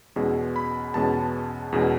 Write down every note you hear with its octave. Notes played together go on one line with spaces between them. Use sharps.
E2 B2 G#3 C#4
B5
E2 B2 G#3 C#4 A5
E2 B2 G#3 C#4